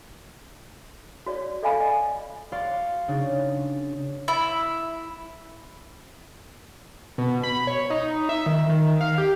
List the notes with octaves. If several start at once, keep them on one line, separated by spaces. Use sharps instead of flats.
F#4 C#5 D5
A4 D5 D#5 F5 G#5 B5
D#5
F#4 D5 F5 C6
C#3 D4 D#4
E4
B2
B5
C#5
D#4
E5
D#3
D#3
F5
G4